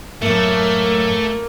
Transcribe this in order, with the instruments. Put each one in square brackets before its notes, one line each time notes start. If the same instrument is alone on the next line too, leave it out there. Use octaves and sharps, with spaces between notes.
[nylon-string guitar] F#2 A2 [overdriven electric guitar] A3 [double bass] A#3